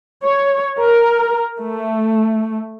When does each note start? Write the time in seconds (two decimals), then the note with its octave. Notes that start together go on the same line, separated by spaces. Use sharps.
0.24 C#5
0.80 A#4
1.61 A3